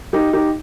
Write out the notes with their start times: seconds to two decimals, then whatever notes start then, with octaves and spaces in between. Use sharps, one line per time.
0.13 D#4 G4
0.33 D#4 G4